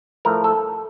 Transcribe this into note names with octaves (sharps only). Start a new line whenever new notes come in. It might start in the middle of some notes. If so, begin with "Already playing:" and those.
A2 F3 A3 A#4
A4